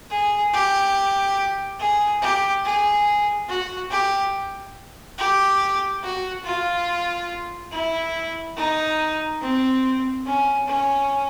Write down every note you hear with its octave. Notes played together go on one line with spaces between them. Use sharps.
G#4
G4
G#4
G4
G#4
F#4
G4
G4
F#4
F4
E4
D#4
C4
C#4
C#4